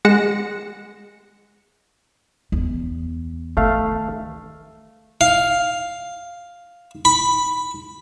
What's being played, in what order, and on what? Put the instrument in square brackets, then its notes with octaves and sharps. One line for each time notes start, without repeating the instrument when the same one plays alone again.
[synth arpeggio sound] G#3 F#5 A#6 C#7 E7
[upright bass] E2
[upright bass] D#3 [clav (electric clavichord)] A3 F5
[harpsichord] F5
B5